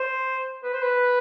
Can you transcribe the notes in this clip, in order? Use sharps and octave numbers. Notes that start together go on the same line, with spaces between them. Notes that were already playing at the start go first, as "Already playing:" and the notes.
Already playing: C5
B4
C5
B4